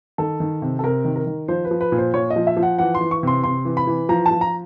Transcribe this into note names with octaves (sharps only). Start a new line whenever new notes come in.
D#3 A4
D#3
C3
A4
C3 A#4
D#3
A#4
D#3
F3 C5
B4
F3
B4
A#2
C5
A#2 C#5
D#5
F3
E5
F3
F#5
E3 F#5
C6
E3
C#6
C3 C6
C3 C6
E3
B5
E3
F3 A#5
A5
F3
A#5